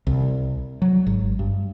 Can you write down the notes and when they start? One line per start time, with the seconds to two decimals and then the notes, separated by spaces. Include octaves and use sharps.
0.07 C2
0.82 F#3
1.07 G#1
1.39 G2